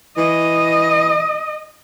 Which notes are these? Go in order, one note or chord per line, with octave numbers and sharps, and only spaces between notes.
E3 D#5